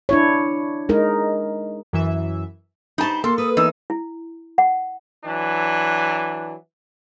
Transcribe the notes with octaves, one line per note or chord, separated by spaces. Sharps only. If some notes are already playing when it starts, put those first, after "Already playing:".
D4 E4 C#5
G#3 D#4 A#4
F#2 E3 E5
D#4 G4 C5 A5 B5
A#3 A4 C6
B4 D#6
E2 D#4 E6
E4
F#5
E3 F#3 D4